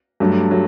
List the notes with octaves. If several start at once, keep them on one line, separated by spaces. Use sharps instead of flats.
G2 F#3 A3
F#3 A3